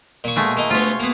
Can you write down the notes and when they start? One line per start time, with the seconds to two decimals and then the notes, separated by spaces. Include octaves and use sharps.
0.24 A#2 C#6
0.36 B2 G#3 A3
0.57 A#3 D#4
0.70 D2 B3 F4 C#5
1.00 A#3 B3